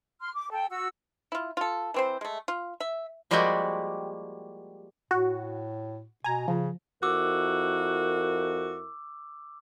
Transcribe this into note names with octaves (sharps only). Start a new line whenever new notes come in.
C6 F6
D6
A4 G5
F#4 E6
E4 F4
F4 A4
E3 C4 C5
G#3 A3
F4
E5
F3 G3 G#3 A#3 F#4 G4
A2 F#4
B2 G#5 A#5
C#3 F3
F2 E4 F#4 A#4 D6 E6